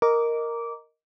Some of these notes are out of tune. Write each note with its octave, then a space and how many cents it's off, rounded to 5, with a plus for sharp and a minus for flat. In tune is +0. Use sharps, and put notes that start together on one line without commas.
A#4 +0 D#5 +0 D6 -15